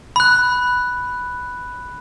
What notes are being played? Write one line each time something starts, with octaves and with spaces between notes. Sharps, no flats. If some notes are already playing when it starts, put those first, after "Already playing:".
B5 F#6